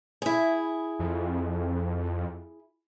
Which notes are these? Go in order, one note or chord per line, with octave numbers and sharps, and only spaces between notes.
E4 G#4
F2